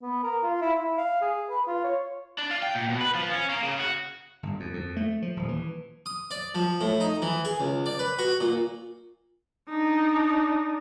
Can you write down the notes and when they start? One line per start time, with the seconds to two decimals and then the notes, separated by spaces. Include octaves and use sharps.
0.02 B3
0.23 A#4
0.43 F4
0.62 E4
0.75 E4
0.97 F5
1.22 G#4
1.49 B4
1.67 F4
1.84 C#5
2.38 D4
2.51 F4
2.62 G5
2.75 A#2
2.89 B2
3.01 B4
3.15 F3
3.29 C#4
3.49 A#3
3.62 C#3
3.79 F#4
4.43 G1
4.60 F2
4.73 F2
4.97 A3
5.22 F3
5.37 D#1
5.48 E3
6.06 D#6
6.31 D5
6.55 F3
6.81 A2
7.00 D#4
7.22 E3
7.45 G#4
7.60 C#2
7.86 D5
7.99 B4
8.19 F#4
8.40 A#2
9.69 D4 D#4